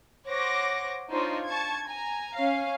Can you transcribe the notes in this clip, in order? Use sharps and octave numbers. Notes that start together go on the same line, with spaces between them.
C5 C#5 F#5 D6 A#6
D4 D#4 F4 C5 C#5
A5 C#6 G#6
G#5 A#5
C#4 F5